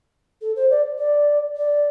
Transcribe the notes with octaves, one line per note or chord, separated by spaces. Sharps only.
A4
C5
D5
D5
D5